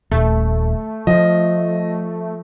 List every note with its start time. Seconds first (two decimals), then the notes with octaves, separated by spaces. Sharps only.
0.11 D#1 A3
1.07 F3 D#5